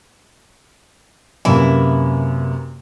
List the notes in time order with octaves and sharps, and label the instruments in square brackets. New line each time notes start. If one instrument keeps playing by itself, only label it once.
[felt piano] F#2 C3 A#3 [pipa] E3 E4